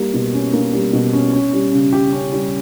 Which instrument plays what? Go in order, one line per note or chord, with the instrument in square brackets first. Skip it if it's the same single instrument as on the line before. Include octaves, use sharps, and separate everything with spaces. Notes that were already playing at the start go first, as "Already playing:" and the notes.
Already playing: [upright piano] G3 A#3
B2
C#4
A#3
G3
B2
C#4
C#4
G3
C#3
G4
C#4
G3